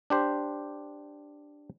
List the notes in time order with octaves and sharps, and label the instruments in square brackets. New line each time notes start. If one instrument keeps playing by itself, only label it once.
[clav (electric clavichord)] D4 G4 C5